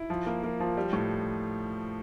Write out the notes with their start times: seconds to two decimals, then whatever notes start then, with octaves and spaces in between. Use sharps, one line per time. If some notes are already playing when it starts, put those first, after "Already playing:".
Already playing: E4
0.10 F3
0.26 A#3
0.44 A#3
0.60 F3
0.77 G3
0.93 A2